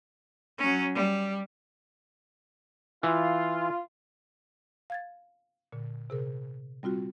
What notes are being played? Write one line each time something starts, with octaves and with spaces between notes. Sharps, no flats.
F#3 C#4
G3
E3 F4
F5 G#6 A6
A#2 D3
C3 G#4 A#4
G3 C4 F4 F#4